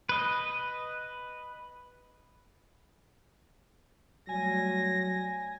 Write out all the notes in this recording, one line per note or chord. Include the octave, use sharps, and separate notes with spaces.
B4 D#5
F#3 G3 A3 G#5 A#6